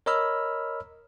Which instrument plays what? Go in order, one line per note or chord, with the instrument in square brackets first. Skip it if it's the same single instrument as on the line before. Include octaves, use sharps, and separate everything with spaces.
[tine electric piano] A#4 C#5 D#5 B5 E6 F6